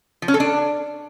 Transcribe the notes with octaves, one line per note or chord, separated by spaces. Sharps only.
F3
C#4
A4
D4